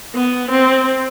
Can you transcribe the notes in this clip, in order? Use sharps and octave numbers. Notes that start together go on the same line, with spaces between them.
B3
C4